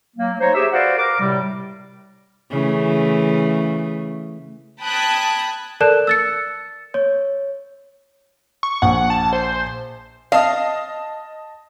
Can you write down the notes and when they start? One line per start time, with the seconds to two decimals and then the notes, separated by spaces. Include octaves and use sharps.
0.16 F#3 A#3
0.40 D#4 C5 C#5
0.55 G4 G#4 E5
0.72 F#4 B4 C5 D5 F5 F#5
0.97 A#4 D6
1.19 A2 C3 G3
2.50 C#3 E3 A3
4.80 G5 A5 B5 D#6 F#6 G#6
5.80 A4 A#4 D5 A5 F#6 E7
6.07 E6 A6 C#7
6.94 C#5
8.63 C#6
8.82 A#1 F#5
9.10 A5
9.33 C5
10.32 D#5 F5 A5 D#6